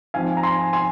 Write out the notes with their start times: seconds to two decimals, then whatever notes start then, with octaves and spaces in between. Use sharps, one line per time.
0.14 G#2 F3 C4 F5 G#5
0.37 A#5
0.43 G#5 C6
0.73 G#5 C6